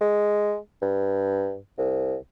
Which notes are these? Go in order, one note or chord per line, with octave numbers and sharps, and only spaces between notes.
G#3
G2
C2